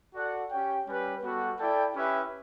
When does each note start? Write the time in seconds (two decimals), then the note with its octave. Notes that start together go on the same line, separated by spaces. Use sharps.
0.14 F#4 A4 D5 F#5
0.51 C#4 G4 C#5 G5
0.87 G3 C#4 G4 B4
1.22 G3 B3 F#4 A4
1.59 E4 A4 D5 G5
1.94 C#4 E4 G4 B4 E5